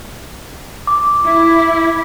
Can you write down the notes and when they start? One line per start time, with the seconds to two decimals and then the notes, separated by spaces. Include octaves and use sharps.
0.87 D6
1.24 E4